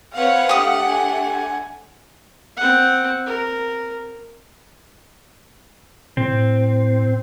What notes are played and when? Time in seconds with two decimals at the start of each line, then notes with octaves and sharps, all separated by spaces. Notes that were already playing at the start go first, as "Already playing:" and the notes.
0.14 C4 B4 C#5 F5 F#5
0.49 A3 D4 G4 D#6
0.87 G#5
1.28 G#5
2.57 C4 F#5
3.26 A#4
6.17 A2 C4